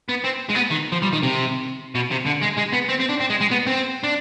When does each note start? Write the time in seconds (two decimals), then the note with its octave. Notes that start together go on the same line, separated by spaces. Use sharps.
0.09 B3
0.24 C4
0.50 G#3
0.56 B3
0.71 D#3
0.92 F3
1.02 G3
1.13 D#3
1.23 C3
1.95 B2
2.11 C3
2.26 D3
2.42 G#3
2.58 G#3
2.73 B3
2.89 C4
3.00 C4
3.09 D4
3.20 C4
3.30 G#3
3.41 G#3
3.51 B3
3.67 C4
4.03 D4